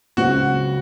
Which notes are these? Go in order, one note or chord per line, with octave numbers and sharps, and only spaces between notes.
C#2 C#3 F#3 C4 F#4